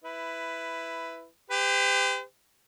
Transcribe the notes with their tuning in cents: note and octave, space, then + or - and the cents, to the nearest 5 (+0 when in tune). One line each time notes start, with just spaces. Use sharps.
E4 +0 B4 +10
G4 +25 C5 -45